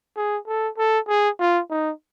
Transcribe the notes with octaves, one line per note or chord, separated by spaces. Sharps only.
G#4
A4
A4
G#4
F4
D#4